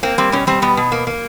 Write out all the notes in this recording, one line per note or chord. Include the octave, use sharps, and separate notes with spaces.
A#3 C4
G3 C4
B2 C#4
G3 C4
B2 B3
B2
A#3
A#3